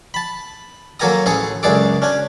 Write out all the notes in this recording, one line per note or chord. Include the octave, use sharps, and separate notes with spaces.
A5 B5
F#3 A#3 A4 G#5 A#5 D#6
A1 G#4 A4 C#5 G#5
C#2 F#2 D4 G#4 A4 D6
C#4 D4 G#5